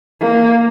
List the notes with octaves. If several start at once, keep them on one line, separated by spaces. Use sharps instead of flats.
A#3